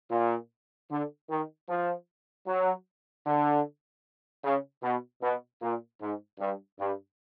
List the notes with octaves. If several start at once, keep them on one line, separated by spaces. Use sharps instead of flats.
A#2
D3
D#3
F3
F#3
D3
C#3
B2
B2
A#2
G#2
G2
G2